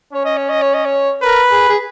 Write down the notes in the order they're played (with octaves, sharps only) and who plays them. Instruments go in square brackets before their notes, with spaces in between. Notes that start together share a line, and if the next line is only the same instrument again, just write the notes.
[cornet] C#4 [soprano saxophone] C#5
[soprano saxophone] D#5
C#5
D#5
C#5
D#5
C#5
[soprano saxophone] A#4 [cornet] B4
[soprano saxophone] G#4
G#4